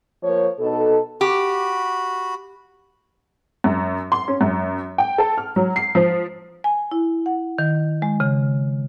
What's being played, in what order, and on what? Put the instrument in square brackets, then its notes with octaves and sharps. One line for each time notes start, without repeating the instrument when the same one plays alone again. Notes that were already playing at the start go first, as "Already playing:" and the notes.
[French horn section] F3 A#3 C#5
B2 D#4 A4
[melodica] F#4 B5 [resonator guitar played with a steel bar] G4
[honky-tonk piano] F#2
C6
C#4
F#2
G5
A4
F6
F#3
C7
F3
[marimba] G#5
E4
F#5
D#3
G#3
C#3